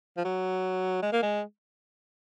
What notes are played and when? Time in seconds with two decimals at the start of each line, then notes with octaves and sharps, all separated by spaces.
0.17 F3
0.25 F#3
1.02 G#3
1.13 A#3
1.22 G#3